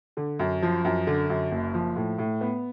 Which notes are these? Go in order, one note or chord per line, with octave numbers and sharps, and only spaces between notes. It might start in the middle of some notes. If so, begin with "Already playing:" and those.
D3
F#2
F3
F#2
D3
F#2
F#1
F3
A2
A2
B3